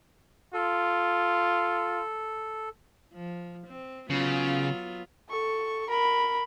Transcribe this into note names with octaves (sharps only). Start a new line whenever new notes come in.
F4 A4
F3
C4
C#3 F#3 B3 F4
A4 C#6
A#4 B5